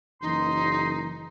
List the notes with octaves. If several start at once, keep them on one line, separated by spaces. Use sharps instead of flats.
F#1 E3 D#4 C6